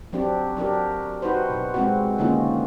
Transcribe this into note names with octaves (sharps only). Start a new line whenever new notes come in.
F#3 C4 D4 G4
F#3 D4 G4 A#4
D#4 F#4 B4 C5
B2
G#3 C4 F#4
D3 D#3 A#3 C#4 D#4 F4